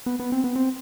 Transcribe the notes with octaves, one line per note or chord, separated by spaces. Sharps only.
B3
B3
C4
B3
C4